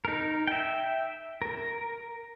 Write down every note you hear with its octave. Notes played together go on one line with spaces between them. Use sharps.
D#4 A#4
E5 G5
A#4